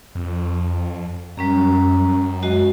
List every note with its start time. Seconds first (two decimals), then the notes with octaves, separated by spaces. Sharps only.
0.15 F2
1.37 F#2 G3 C#4 A#5
2.42 G#3 F#4 D#5